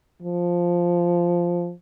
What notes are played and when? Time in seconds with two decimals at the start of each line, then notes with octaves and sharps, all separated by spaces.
0.22 F3